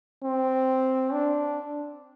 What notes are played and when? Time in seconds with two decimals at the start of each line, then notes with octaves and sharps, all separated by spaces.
0.24 C4
1.13 D4